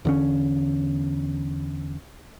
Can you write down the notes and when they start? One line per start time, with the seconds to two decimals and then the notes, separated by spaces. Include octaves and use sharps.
0.05 E2 D3 C#4